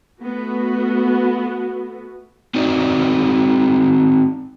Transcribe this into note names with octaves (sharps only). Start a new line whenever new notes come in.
A3 B3 F#4
C4 D#4 F#4 D5